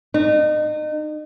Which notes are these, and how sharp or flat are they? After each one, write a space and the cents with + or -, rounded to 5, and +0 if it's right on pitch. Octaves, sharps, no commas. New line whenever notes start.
D#4 -35